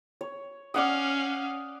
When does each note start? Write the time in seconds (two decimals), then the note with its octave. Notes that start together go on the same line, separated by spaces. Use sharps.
0.21 C#5
0.74 C#4 D5 F5 F#5 D#6